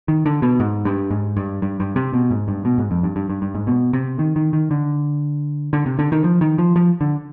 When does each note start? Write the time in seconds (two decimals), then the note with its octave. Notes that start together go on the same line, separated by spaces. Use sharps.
0.08 D#3
0.26 D3
0.42 B2
0.60 G#2
0.85 G2
1.11 G#2
1.37 G2
1.62 G2
1.80 G2
1.96 C3
2.14 B2
2.31 G#2
2.48 G2
2.65 B2
2.78 G#2
2.91 F2
3.03 G2
3.16 G2
3.30 G2
3.42 G2
3.55 G#2
3.67 B2
3.93 C3
4.19 D#3
4.36 D#3
4.53 D#3
4.71 D3
5.73 D3
5.86 C3
5.99 D3
6.12 D#3
6.24 F3
6.41 D#3
6.58 F3
6.76 F3
7.01 D3